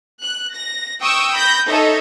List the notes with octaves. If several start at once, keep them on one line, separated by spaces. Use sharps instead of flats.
F#6
A#6
G5 C#6 D#6 E6
B5 G6 A#6
D#4 A4 C#5 D#5 E5